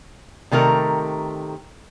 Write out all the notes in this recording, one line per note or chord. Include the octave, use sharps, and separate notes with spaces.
C3 D#3 A3 A#4